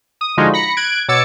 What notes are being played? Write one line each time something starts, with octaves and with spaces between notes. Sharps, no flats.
D#6
D3 F3 G#3 D#4 F4 F#4
B5 A#6 C#7
F#6 G#6 D7
B2 C#5 D6 E6 A6 C#7